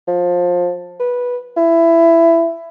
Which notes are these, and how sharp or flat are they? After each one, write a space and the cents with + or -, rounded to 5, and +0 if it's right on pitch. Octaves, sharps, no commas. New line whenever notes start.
F3 +20
B4 -10
E4 +15